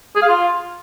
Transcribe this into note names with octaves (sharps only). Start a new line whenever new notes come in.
G#4
F5
F4